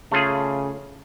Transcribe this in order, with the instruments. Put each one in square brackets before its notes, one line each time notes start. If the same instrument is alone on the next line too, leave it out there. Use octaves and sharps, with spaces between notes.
[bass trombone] C#3 [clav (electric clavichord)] A3 F4 G#4